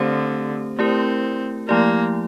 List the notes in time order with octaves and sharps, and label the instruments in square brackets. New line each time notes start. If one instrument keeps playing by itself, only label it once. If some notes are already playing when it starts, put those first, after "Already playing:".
Already playing: [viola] D3 [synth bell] A3 C4 G4 C5
[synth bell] A3 E4 G4 A#4 [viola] C4
[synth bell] F3 A3 E4 G4 D5 [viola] A#3